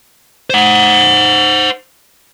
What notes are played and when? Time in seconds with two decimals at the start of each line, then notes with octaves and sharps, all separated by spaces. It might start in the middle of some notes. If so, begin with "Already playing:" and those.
0.50 C5 F#5